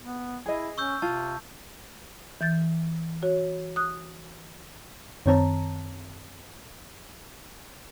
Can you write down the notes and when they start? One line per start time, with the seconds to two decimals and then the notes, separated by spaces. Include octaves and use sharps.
0.03 B3
0.46 E4 G#4 D#5
0.78 C#4 C#6 E6 G6
1.02 C3 F4 A5
2.41 E3 G6 A6
3.23 F#4 C#5
3.76 D#6 F#6
5.26 F#2 D#3 C4 C#5 A5 A#5